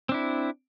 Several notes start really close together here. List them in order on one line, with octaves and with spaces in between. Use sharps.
C4 D4 E4